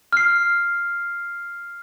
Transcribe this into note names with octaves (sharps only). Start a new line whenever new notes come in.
F6 C7